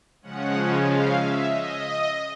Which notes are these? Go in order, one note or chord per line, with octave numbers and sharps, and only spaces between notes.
C#3 F3 G#3 C#4 F#5
F5
E5
D#5